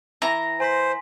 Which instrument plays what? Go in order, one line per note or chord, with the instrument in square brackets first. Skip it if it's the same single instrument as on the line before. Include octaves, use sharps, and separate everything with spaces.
[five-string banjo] E3 [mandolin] A#5
[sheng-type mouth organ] C5 [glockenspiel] G#5 C6 B6